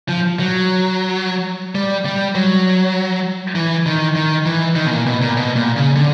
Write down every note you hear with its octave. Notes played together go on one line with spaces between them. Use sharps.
F3
F#3
G3
G3
F#3
E3
D#3
D#3
E3
D#3
B2
A#2
B2
A#2
B2
A#2
C#3
D3